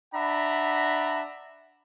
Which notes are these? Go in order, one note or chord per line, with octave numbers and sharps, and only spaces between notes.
D4 E5 F#5 A#5 B5